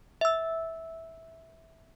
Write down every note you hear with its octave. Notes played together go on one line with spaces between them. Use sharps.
E5 E6